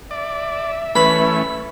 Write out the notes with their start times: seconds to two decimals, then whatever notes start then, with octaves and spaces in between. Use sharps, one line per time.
0.11 D5 E5
0.95 E3 A3 C#4 B4 B5